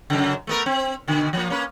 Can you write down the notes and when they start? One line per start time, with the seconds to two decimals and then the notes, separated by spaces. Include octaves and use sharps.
0.10 F#2 C#3
0.47 A3 B3 A#4
0.66 C4
1.08 B2 D3
1.33 F3 A#3
1.50 A#3 C#4 B4